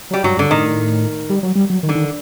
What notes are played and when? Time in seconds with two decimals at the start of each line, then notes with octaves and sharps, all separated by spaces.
0.11 F#3 G3
0.24 G2 F#3
0.37 G2 D3
0.51 A2 D#3
1.30 G3
1.43 F#3
1.56 G3
1.70 F#3
1.83 D#3
1.89 D3
1.95 D#3